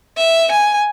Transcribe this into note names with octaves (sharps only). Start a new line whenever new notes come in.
E5
G#5